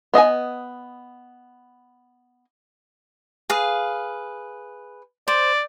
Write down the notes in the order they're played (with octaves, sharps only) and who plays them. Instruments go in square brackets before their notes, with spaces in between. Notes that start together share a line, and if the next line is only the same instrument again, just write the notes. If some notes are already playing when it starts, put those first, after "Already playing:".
[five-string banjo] B3 D#5 F5 G#5
[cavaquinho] G#4 B4 F5
[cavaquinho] C5 [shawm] D5